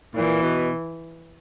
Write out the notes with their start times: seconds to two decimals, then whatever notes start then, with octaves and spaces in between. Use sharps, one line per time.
0.15 A#2 E3
0.42 B2